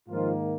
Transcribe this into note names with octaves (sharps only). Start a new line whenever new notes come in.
G#2 D#3 F3 A#3 F4